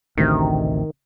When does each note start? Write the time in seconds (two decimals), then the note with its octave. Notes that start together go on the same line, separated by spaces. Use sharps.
0.17 A1 D2 C3 D#3